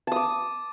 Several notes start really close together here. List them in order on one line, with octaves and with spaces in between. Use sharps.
A5 D#6 D6